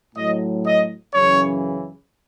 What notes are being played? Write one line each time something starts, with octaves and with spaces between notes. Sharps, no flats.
A2 F#3 D#5
D#5
F#2 C#3 E3 C#5